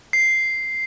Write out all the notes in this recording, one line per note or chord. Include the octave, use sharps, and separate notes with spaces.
C7